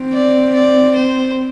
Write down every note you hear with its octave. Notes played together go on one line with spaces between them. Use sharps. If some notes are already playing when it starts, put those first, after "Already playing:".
Already playing: C4
D5
D5
C5